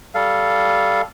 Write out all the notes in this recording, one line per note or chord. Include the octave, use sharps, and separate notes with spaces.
G3 A4 F5